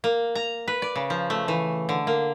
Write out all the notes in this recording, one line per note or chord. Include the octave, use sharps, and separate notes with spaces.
A#3
A#5
B4
D5
C#3
F3
A3
E3
D3
A#3